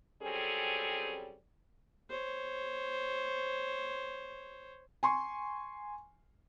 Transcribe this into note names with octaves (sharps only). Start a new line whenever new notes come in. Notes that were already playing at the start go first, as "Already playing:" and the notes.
F#3 G3 C4 C#4 G#4 A4
C5 C#5
G#5 C6 C#6